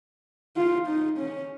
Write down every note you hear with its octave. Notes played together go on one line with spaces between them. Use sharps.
F4
D#4
C#4